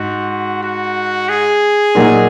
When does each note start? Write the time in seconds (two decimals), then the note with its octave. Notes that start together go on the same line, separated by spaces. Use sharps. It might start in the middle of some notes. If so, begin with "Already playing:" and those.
Already playing: G#2 F#4
0.63 F#4
1.29 G#4
1.95 A#2 F#3 A#3 D#4